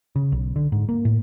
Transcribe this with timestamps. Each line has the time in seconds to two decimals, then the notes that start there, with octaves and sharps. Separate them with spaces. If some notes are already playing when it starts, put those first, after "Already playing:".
0.16 C#3
0.32 B1
0.56 D3
0.72 G#2
0.89 A#3
1.05 A2